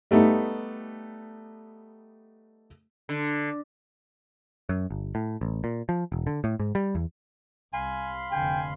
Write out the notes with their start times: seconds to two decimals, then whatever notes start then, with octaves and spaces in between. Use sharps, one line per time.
0.11 G3 A3 B3 D#4
3.09 D3
4.69 F#2
4.90 G1
5.15 A2
5.41 A1
5.64 A#2
5.89 F3
6.12 E1
6.27 D3
6.44 A2
6.59 G#2
6.75 G3
6.95 E2
7.73 C2 F5 G#5 B5 C6
8.32 F1 D3 G5 G#5